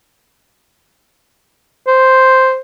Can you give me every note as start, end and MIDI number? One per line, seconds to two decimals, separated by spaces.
1.87 2.59 72